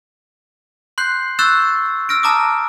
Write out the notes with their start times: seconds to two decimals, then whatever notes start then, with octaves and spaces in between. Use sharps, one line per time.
0.98 C6 F#6 G6 C7
1.39 C#6 E6 F#6 G6 A6 E7
2.09 E6 F6 A#6 D7
2.23 A5 A#5 D6 D#6